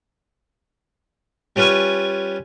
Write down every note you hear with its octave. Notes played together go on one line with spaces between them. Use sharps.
G3 C#4 F4 B4 G#5 C#6